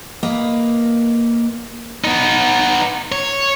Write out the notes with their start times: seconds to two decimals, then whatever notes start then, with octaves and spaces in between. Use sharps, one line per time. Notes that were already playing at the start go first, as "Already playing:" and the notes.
0.23 A#3 B4 D#5
2.04 B3 D#4
3.12 C#5